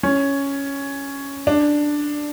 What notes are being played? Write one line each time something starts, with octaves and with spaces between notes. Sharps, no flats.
C#4
D4